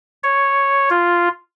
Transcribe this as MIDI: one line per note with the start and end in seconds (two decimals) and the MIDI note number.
0.23 0.89 73
0.90 1.29 65